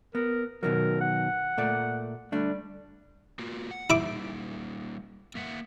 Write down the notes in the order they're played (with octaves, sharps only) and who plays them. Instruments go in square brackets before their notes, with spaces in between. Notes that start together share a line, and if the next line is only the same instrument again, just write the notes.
[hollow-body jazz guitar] B3 [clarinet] A#4
[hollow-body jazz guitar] B2 D#3 F#3 [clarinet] A#4
[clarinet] F#5
[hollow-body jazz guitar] A#2 A3 D5
[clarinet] G3 [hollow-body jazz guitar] A3 D4
[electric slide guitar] A#3 F4 F#4
F#5
[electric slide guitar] G3 A#3 D#4 [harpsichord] E4 D6
[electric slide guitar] A#3 E5 F#5